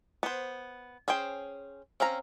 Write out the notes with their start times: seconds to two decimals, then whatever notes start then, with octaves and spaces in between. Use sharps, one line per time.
0.23 B3 C5
1.08 C#4 G#4 C5 G5
2.00 C4 C#4 F5 A#5